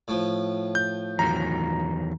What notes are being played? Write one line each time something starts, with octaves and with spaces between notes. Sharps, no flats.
A2 F3
G6
E2 D#3 F#3 A#5